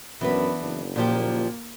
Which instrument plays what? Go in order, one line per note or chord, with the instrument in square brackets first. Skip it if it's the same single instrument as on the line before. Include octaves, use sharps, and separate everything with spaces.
[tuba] F#2 [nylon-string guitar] E3 B4 [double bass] B3 D4
[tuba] F#1
[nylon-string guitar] A#2 F3 G4 [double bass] A#3